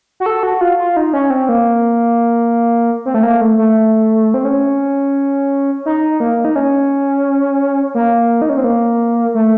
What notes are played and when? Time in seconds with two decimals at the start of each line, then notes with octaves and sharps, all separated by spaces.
0.20 F#4
0.26 A4
0.43 F#4
0.61 F4
0.78 F4
0.97 D#4
1.13 C#4
1.30 C4
1.49 A#3
3.06 C4
3.14 A3
3.23 A#3
3.41 A3
3.58 A3
4.34 C4
4.45 C#4
5.86 D#4
6.20 A#3
6.45 D#4
6.56 C#4
7.95 A#3
8.42 D#4
8.49 C#4
8.57 C4
8.64 A#3
9.34 A3